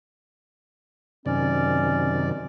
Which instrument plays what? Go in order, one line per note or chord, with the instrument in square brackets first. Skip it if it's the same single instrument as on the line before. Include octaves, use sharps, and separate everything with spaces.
[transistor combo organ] F#2 C3 D#3 [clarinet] C#4 [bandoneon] D5